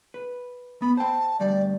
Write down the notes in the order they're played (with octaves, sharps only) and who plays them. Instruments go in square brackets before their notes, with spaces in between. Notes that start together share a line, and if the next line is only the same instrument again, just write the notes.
[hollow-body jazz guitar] B4
[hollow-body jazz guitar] B3 [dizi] B5
[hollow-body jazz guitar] C5 G5 [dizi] A5
[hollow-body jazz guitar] D2 G2 G3 [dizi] D5